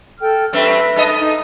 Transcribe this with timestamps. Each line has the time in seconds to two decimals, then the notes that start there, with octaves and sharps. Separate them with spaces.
0.20 A4 G5 F6
0.53 F#2 A3 C4 B4 E5
0.96 G2 A4 D#5
1.20 D#4